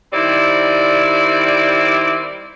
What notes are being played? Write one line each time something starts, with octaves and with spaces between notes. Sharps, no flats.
D#3 G3 C4 E4 D5